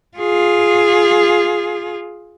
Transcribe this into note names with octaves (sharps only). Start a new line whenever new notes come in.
F4 G#4